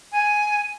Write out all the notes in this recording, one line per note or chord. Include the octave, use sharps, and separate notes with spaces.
G#5